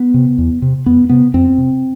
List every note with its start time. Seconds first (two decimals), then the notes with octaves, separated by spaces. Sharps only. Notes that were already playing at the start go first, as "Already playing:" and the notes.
Already playing: B3
0.14 C3
0.38 E2
0.62 C3
0.86 F2 B3
1.09 C3 B3
1.34 F2 C4
1.58 C3